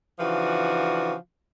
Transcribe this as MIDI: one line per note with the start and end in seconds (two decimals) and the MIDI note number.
0.19 1.15 49
0.19 1.15 52
0.19 1.15 53
0.19 1.15 62
0.19 1.15 66